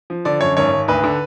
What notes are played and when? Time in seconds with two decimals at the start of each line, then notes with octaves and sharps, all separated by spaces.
0.10 F3
0.25 D3 D5
0.41 F#2 C#5
0.57 G#1 C#5
0.72 G#1
0.88 D2 B4
1.04 D3